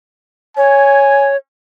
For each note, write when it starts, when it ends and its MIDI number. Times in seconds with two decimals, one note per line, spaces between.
0.57 1.36 73
0.57 1.31 80